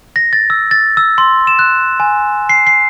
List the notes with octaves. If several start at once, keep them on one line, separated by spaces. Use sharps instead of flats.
A#6
A6
E6
A6
E6
C6
E7
F#6
G#5
C7
C7